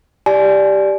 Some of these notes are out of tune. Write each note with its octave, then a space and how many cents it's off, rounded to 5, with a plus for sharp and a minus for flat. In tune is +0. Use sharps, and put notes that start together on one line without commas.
G4 +0 D5 +0 G#5 +35